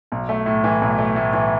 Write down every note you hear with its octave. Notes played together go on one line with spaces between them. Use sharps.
B1
A3
A2
E3
B1
A3
A2
E3